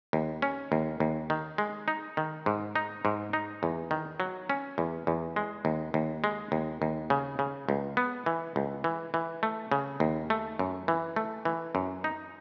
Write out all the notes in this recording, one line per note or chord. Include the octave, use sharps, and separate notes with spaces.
D#2
C#4
D#2
D#2
D#3
G#3
D#4
D#3
G#2
D#4
G#2
D#4
E2
D#3
F#3
C#4
E2
E2
G#3
D#2
D#2
G#3
D#2
D#2
C#3
C#3
C#2
B3
E3
C#2
E3
E3
A3
C#3
D#2
A3
F#2
E3
A3
E3
F#2
D#4